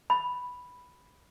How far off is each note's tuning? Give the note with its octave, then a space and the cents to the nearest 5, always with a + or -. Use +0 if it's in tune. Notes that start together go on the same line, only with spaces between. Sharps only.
B5 +0